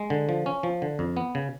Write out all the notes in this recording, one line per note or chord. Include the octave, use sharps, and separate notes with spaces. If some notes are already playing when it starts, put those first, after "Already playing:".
Already playing: G#3
D3
F3
C#4
F3
D3
F2
B3
C#3